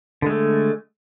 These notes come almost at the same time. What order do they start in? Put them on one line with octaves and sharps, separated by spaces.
D3 G#3 A3